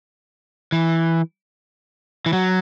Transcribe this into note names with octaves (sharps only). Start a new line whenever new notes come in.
E3
E3
F#3